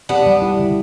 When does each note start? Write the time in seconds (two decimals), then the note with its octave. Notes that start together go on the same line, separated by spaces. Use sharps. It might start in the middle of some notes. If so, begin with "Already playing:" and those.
0.09 B3 D4 G4
0.26 G3
0.42 E4
0.59 D3